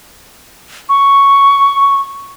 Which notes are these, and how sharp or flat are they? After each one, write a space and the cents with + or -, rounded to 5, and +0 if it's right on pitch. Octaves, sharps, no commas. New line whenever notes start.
C#6 +5